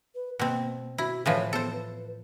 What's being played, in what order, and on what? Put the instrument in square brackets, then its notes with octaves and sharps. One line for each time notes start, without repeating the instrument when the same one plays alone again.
[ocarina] B4
[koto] B2 C4 [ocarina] A#3
[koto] E4 [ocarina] F#4
[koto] A2 E3 F3 [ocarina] C#5
[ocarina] B3 [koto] A4 C5
[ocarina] B4